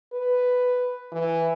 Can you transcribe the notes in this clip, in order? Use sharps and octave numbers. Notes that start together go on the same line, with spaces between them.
B4
E3